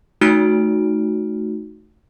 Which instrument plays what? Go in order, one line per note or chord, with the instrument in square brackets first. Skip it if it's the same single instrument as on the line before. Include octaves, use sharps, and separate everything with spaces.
[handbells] A3 D#4 F#4 F6 D7